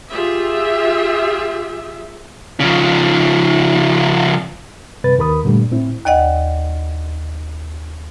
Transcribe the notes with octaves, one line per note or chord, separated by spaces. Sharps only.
F4 G4 G#4 E5
C#3 F3
G2 C3 B4 A6
D#2 A#4 B5 D#6
G2 A#2 D3 G3 A3
A2 C4 E4
D#2 D5 D#5 F#5